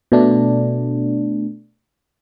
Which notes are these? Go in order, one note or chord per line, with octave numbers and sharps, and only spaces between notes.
B2 A3 D4